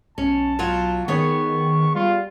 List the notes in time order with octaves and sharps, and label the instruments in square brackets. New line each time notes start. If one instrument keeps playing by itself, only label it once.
[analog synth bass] B1 [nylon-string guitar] C#4 [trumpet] A5
[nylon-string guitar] F#3 F4 F#4
[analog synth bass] D#3 [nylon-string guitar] B3 G#4 C#5 [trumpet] C#6
[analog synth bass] G3 [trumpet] F4